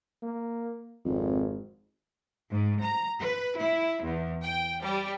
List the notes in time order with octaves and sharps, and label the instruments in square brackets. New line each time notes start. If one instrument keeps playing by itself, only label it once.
[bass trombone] A#3
[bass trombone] G#1 [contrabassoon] F2
[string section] G#2
A#5
B4
E4
E2
G5
G3